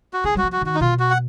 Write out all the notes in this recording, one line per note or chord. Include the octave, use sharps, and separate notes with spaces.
F#4
D#3 G#4
F#3
F#4
F3
F#4
D#3
F#4
D#4
B2 F4
F#4
F#5